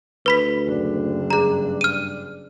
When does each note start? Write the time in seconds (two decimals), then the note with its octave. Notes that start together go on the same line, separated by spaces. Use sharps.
0.26 D2 B4 B5 B6
0.66 F#1 D4
1.30 G2 G#4 A#5
1.81 F6 D#7